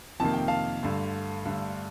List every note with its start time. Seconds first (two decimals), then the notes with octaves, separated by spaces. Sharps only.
0.20 F2 C3 D#3 A#3 A5
0.34 G5
0.48 F5 A5
0.83 G2 D3 A3
1.45 G2 D3 A3